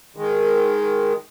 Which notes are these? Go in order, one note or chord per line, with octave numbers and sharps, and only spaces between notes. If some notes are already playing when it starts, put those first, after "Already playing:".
D#3 G#3